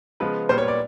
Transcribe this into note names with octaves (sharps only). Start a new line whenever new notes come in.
C#3 F3 G#3 B3 B4
A#2 G3 B3 C5
C#5
D5